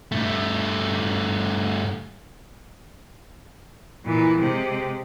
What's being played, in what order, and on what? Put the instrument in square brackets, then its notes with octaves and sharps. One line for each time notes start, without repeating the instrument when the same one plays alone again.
[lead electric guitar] G2 A3
[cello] A#2 E3
C3 G#3